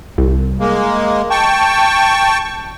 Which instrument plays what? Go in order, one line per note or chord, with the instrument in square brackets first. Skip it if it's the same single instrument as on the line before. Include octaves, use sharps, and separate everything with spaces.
[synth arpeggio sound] C2
[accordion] G#3 A#3
G5 A5 C#6